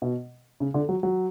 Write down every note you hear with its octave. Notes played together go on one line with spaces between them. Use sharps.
B2
C#3
D3
F#3
F#3